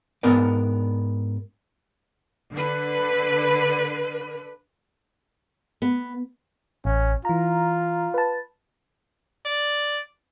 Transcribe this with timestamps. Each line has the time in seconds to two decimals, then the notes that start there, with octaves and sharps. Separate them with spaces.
0.23 G#2 B3 D4 A#4 D5
2.53 D3 B4
5.82 B3
6.85 A1 C#4
7.25 E3 F4 A#5
8.14 B4 A5
9.46 D5